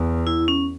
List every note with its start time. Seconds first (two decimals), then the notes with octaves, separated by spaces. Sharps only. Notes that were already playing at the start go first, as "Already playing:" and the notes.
Already playing: E2
0.27 E4
0.48 C#4